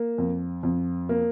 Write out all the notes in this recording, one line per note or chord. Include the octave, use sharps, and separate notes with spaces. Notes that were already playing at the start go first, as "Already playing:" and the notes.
Already playing: A#3
F2
F2
A#3